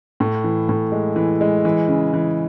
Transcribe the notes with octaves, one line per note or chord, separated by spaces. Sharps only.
A2
E3
A2
G#3
E3
G#3
E3
C#3
E3